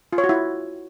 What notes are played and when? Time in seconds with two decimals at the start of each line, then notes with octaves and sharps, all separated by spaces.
0.13 F4
0.18 C#5
0.24 F#4
0.29 E4